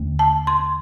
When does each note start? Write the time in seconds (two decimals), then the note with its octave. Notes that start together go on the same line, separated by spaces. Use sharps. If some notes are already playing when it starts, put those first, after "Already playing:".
Already playing: D#2 D3 A3
0.19 A5
0.47 C6